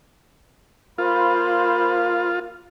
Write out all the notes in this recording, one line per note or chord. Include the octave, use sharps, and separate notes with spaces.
A#3 F4 C5 B5 C6